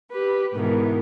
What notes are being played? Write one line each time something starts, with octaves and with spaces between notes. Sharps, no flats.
G4 B4
G#2 B2 D#3 E3